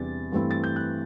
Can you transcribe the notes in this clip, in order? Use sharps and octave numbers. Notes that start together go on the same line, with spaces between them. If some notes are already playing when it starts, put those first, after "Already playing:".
Already playing: E2 C3 G3 D4 A6
G2 E3 A3 C4 E4
A6
G6
F#6